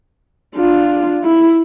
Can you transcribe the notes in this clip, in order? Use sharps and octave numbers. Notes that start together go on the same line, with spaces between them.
D4 F4
E4